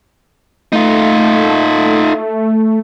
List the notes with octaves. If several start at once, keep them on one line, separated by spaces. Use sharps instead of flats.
A3 D#4 F4